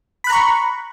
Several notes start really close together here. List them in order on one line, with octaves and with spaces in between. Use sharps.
B5 F#6 A#5 C#6